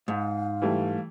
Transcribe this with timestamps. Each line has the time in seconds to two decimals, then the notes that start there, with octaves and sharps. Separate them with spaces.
0.08 G#2 F5
0.62 E3 G3 A3